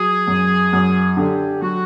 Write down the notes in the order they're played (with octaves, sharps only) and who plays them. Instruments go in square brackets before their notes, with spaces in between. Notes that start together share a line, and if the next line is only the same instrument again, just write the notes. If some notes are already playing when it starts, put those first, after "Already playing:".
Already playing: [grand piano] F#3 [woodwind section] G#4
[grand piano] F#2
F#2
[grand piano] D3 [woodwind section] G4
[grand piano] F#3 [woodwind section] F#4